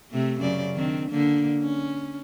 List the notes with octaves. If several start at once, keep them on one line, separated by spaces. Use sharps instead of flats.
C3 A3
F#2 C#3 D5
D#3 C4 D4
D3 A#3 D4
C#4